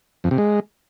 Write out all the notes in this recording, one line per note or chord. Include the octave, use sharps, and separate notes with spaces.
F2
C3
G#3